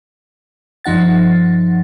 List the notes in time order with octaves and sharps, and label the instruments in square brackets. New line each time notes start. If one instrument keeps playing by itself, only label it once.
[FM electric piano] G2 F3 D#4 F#5 A6